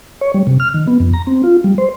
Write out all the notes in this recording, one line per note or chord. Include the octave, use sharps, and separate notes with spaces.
C#5
G3
C3
F6
D#3
B3
F2
A#5
C4
F4
G3
C5